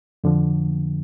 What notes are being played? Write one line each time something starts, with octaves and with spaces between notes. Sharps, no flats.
F2 D3 F3